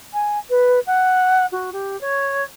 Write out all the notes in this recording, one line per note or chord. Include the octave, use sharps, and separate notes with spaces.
G#5
B4
F#5
F#4
G4
C#5